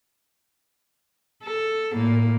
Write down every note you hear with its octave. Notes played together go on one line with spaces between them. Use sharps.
A4
A2 A#3